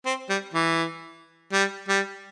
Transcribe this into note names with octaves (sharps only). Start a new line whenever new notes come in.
C4
G3
E3
G3
G3